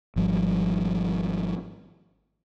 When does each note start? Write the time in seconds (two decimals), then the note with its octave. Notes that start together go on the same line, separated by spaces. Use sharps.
0.16 G#1 F3 G3